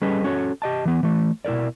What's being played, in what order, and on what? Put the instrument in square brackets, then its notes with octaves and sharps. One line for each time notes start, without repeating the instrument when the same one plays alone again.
[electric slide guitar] G3 C#4 G#4 A4 B4 D#5
C#4 F#4 A4 C#5
G4 D#5 A5
E3 B3
E3 A3
B2 E4 A4 A#4 D5